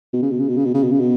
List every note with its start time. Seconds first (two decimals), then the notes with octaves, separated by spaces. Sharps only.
0.13 B2
0.23 C#3
0.31 B2
0.40 C#3
0.48 B2
0.57 C#3
0.65 B2
0.74 C#3
0.83 B2
0.91 C#3
1.00 B2